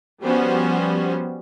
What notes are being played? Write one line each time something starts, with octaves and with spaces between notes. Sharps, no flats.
F3 G3 B3 C#4 F#4 C5